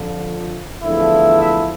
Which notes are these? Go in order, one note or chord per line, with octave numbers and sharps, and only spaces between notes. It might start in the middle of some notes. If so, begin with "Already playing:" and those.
Already playing: F2 D3 F3
E2 D3 F3 A3 E4
E5